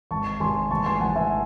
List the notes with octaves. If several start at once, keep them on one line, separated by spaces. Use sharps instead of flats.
G#1 A5 C#6
G#1 G#5 C6
A1 A5 C#6
G#5 C6
A1 F#5 A5
E5 G#5